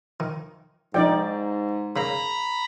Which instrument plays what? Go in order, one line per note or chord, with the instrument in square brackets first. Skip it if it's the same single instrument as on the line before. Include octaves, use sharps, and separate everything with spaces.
[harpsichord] D#3
[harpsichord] A#1 [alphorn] G#2 [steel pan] D#4 D5 G5
[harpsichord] C#3 A#3 [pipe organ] A#5 B5